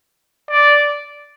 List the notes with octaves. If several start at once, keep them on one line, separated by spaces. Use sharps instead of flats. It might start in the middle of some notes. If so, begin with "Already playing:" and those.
D5